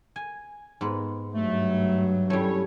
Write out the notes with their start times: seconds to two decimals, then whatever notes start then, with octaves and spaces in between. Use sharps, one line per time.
0.16 G#5
0.81 G#2 B3
1.35 G2 F#3 A3
2.30 G3 A3 C#4 E4 C#5